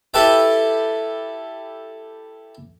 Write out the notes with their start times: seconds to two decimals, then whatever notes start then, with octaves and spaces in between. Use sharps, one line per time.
0.14 E4 G4 A4 B4 E5 G5